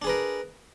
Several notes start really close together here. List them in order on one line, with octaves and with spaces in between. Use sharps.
D4 G#4 B4 A#4